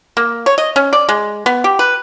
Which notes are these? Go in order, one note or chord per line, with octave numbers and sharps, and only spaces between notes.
A#3
C#5
D#5
C#4
D5
G#3
B3
G4
B4